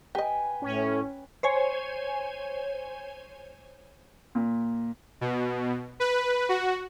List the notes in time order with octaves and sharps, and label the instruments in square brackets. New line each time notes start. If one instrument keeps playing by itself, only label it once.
[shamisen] G4 D#5 [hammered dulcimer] B4 G5 G#5
[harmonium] A2 [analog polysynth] C#4
[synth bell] C5 C#5 G#5
[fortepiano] A#2
[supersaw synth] B2
B4
F#4